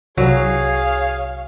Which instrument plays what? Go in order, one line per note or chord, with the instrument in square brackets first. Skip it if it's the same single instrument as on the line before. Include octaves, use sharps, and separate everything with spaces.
[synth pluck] C2 [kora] F#3 [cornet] G#4 [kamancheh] C#5 F5